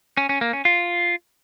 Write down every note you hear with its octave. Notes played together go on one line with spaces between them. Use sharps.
C#4
C#4
A#3
C#4
F4